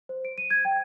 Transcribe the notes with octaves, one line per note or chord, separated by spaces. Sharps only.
C5
D7
D#7
G#6
G5